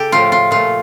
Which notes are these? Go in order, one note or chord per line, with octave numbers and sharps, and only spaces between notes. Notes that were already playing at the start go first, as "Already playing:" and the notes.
Already playing: C#3 G4 A4
A2 F3 A3 F4
F4
A#2 A3 F4